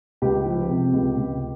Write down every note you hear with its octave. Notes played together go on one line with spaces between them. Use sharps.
C#2 G4
F3
C3
C#2
C#2